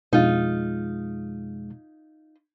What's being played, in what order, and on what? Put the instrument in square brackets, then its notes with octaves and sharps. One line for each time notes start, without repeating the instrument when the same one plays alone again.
[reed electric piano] F2 G#3 [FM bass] B2 [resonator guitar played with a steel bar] D#4 F4